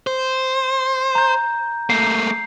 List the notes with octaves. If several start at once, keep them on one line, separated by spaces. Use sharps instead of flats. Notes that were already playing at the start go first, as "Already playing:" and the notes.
C5
A#5 G6
A3 A#3 G6 C7